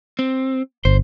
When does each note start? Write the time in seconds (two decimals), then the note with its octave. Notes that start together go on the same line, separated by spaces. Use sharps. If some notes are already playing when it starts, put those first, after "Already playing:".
0.19 C4
0.85 G1 C5